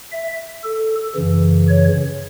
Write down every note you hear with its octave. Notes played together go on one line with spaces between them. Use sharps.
E5
A4
F#2 C#3 E3
C#5